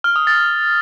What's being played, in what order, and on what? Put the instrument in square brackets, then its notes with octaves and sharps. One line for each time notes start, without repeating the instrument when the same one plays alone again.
[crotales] F6
D#6
A6